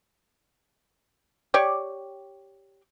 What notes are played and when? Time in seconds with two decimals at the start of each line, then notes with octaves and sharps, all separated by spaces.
1.54 G4 C#5 D5